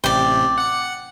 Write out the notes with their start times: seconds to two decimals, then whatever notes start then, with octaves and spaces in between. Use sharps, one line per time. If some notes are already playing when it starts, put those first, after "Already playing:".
0.04 A1 C3 D5 G5
0.58 F#5 C#7